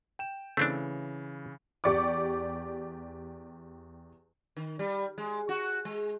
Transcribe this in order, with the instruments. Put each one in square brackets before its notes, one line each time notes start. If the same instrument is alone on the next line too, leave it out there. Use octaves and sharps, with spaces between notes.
[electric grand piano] G5 E7
[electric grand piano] C#3 E3 [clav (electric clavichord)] A3 C4 D4
[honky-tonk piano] E2 G4 D5 C#6 D6
[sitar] D#3
G3
G#3
F#4
G#3